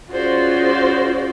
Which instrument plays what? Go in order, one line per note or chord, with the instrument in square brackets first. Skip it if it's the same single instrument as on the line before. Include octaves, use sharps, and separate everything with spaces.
[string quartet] C#4 F4 F#4 G#4 C5 D5